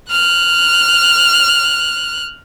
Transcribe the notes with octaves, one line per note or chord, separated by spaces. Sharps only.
F6 F#6